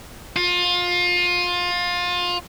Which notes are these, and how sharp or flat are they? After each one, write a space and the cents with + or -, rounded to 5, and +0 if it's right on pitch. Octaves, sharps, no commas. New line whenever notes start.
F4 +25